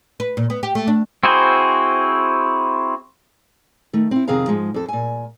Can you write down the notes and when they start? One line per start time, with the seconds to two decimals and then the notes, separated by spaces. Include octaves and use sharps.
0.20 B4
0.37 A#2
0.50 B3
0.63 G4
0.75 A3
0.88 D4
1.23 C4 E4 F#4 G#4 C5
3.93 D#3 A3
4.11 C4 E4
4.28 F2 C3 D#3 G#4 F5 A#5
4.48 G#2 F3 G#3
4.74 F2 A4
4.88 A#2 G#5